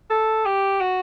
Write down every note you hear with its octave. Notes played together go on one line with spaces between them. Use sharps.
A4
G4
F#4